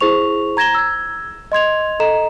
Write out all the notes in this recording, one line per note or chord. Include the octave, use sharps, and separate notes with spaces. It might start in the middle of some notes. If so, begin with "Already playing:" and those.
E4 G#4 C5 C#6 F7
A#5 G#6 A#6 E7 G7
E6 G#6
D#5 C6 G#6 F7
A4 D#5 A#5 E7